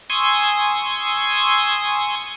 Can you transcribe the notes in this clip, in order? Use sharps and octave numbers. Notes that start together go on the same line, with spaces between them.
G#5 C6 C#6 D#6 E6